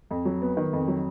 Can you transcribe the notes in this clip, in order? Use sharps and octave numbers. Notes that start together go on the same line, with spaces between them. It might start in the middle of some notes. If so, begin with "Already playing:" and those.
F2
F#3
B3
D#3
F2
F#3